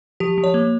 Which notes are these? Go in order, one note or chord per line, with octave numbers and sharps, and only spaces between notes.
F3 G4
F3
C#5
A#3